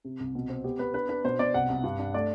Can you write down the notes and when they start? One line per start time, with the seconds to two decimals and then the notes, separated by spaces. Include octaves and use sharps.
0.04 C3
0.20 C2
0.35 B2
0.49 C4
0.64 B3 G4
0.79 B3 B4
0.94 D4 B4
1.09 D4 B4
1.24 B2 C5
1.39 B2 D5
1.54 C2 F#5
1.69 C2
1.83 G2
1.99 D4
2.14 A3 D5